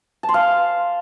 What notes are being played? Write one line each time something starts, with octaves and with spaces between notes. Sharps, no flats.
A5
C6
F5